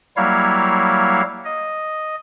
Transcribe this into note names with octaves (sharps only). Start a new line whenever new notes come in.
F#3 G3 A#3 E4 C#5 F5
D#5